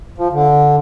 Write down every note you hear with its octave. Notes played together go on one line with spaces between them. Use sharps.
F3
D3